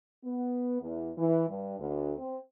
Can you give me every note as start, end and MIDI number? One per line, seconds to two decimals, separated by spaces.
0.24 0.82 59
0.82 1.11 40
1.18 1.45 52
1.49 1.76 43
1.80 2.13 38
2.18 2.38 60